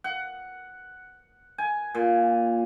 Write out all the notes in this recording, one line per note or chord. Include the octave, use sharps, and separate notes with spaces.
F#5
G#5
A#2